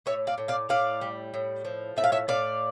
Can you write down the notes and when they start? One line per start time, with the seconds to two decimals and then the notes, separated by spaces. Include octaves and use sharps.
0.06 A2 C#5 E5
0.27 D5 F5
0.38 A2
0.48 D5 F5
0.69 A2 D5 F5
1.01 G3
1.34 A2
1.65 F3
1.97 A2 E5
2.04 F5
2.12 C#5 E5
2.28 A2 D5 F5